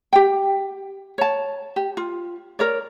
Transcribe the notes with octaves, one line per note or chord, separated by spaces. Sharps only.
G4 G5
C#5 A5
G4
F4
A#4 C#5 D5